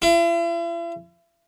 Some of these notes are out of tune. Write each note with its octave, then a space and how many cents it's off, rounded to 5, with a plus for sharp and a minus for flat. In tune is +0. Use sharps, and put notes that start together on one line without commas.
E4 +45